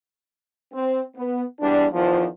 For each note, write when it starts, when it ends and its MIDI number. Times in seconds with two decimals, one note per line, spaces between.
0.73 1.02 60
1.16 1.42 59
1.60 1.86 40
1.60 1.86 55
1.60 1.86 62
1.93 2.25 40
1.93 2.25 51
1.93 2.25 53